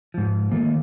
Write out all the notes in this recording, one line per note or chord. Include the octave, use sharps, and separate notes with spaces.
G#2 F3
D#3 A3 A#3